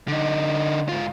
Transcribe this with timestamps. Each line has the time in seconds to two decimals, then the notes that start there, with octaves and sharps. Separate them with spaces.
0.08 D3 D#4
0.89 G#2 F4